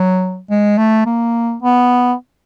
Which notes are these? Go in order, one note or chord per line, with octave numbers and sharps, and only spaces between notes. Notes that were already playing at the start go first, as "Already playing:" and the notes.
Already playing: F#3
G#3
A3
A#3
B3